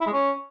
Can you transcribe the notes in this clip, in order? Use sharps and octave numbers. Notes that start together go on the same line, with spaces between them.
E4
G#3
C#4